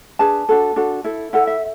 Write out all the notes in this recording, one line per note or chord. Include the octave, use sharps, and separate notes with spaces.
D4 G#4 B4 A5
D4 F#4 A4
D4 F#4 A4
E4 A4
E4 A4 F#5
E5